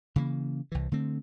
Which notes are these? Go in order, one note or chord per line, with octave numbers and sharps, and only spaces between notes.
C#3 E3 F#3 A#3
C2 E3
D3 A3 C4